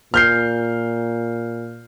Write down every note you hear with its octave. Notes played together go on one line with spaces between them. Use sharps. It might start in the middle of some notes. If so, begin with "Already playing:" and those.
A#2 F6 G6 C7